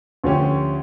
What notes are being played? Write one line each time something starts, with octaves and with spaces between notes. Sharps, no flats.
D2 F3 C#4 G4